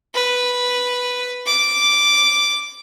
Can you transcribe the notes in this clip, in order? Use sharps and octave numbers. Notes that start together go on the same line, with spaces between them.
B4
D6